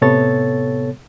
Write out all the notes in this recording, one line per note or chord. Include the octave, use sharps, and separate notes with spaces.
A2 C3 B3 A4 C#5 A6